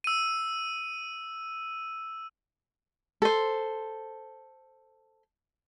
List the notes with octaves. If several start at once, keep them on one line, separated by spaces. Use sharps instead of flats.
E6 D#7
A4 C5